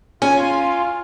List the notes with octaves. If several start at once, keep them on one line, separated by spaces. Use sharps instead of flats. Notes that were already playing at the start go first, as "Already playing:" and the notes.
C#4 F4 G#5